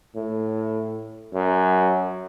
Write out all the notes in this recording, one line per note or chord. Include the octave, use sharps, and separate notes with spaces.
A2
F#2